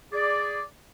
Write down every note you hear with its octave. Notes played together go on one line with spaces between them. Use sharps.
G#4 D5